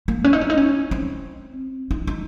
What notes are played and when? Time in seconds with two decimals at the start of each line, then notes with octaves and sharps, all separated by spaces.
0.08 A#3
0.24 C#4
0.33 D#4
0.41 C#4
0.50 D#4
0.58 C#4
0.91 C4
1.91 D#4
2.07 D#4